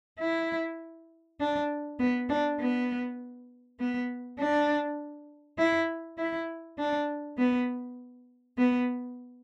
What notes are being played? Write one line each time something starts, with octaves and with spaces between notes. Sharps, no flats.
E4
D4
B3
D4
B3
B3
D4
E4
E4
D4
B3
B3